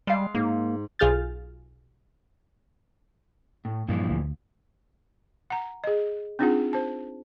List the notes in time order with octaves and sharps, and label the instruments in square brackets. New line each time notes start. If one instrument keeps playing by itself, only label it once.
[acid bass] G3 [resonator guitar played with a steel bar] G#3 F5
[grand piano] G#2 [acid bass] A#3
[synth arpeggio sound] B1 F4 G#4 F6 G6 A6
[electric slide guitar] A2
[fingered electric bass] G2 [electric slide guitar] A#2 E3 F3
[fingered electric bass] D2
[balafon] F#5 A#5
G#4 D#5
C4 D4 D#4 F4 G#4 F#5
C5 A5